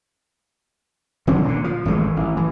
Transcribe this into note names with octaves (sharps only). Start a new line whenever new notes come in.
D3 F#3 C4 C#4
A#2 D3
F3
G#1 E3 G#3 A3
A1
E3